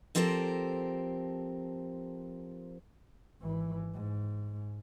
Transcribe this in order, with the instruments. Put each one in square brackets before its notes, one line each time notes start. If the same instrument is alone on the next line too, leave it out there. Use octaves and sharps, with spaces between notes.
[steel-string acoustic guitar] F3 C4 G4 A4 A#4 C5
[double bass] G#1 E3
G#2